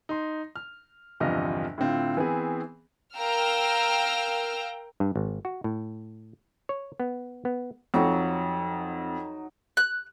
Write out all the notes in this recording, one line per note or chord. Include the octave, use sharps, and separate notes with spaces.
D#4 C6
F6
G1 E2 C3 F3 D#5 F6
A2 D3 C4 F4
E3 B3 C4 G#4
A#4 F5 G5 A#5 E6 F6
G2
G#1
F#4
A2
C#5
B3
B3
F2 F#3 D#4 A5
F#6